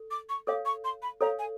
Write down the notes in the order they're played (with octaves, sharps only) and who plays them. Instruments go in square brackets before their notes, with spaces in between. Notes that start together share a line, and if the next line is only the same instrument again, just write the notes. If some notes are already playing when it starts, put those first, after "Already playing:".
Already playing: [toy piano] A4
[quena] D6
C#6
[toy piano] A4 C#5 F5 [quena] D6
[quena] C#6
C6
B5
[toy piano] A4 C#5 F5 [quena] A#5
[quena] G#5